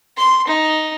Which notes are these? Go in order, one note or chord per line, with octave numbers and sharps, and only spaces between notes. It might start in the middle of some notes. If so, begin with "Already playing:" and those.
C6
D#4